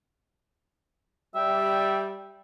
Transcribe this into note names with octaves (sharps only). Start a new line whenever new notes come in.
G3 E5 G5